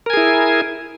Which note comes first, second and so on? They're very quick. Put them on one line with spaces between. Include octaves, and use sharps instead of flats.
A#4 G#5 G#4 E4